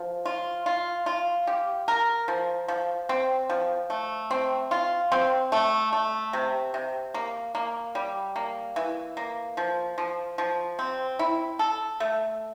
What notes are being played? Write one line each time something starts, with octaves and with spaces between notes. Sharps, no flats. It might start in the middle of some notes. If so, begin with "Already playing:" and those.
Already playing: F3
F4
F4
F4
G4
A#4
F3
F3
C4
F3
A3
C4
F4
C4
A3
A3
C3
C3
A#3
A#3
G3
A#3
E3
A#3
F3
F3
F3
C4
E4
A4
A3